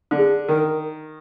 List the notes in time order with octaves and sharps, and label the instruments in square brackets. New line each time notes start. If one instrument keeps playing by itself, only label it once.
[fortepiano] D3
[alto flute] G#4
[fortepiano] D#3 [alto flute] A#4